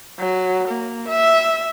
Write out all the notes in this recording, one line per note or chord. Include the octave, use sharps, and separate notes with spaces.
F#3
A#3
E5